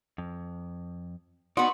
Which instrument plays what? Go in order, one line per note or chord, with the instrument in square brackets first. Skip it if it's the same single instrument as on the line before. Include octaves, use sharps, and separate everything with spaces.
[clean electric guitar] F2
[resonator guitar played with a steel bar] B3 F#4 [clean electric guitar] D#4 D5 [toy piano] C6